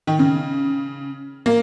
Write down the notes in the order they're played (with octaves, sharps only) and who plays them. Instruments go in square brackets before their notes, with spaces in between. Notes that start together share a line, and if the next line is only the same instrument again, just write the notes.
[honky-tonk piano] D#3
C#3
A#3